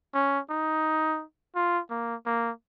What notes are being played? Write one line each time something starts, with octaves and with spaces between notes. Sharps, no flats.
C#4
D#4
F4
A#3
A#3